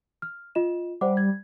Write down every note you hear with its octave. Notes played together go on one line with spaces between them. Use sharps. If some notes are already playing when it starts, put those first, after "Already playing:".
F6
F4 D#5 E7
G3 C5 F#5 D6
G#6